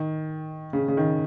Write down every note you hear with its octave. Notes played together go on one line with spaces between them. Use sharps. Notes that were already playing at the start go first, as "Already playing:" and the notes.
Already playing: D#3
C#3
C#3
D#3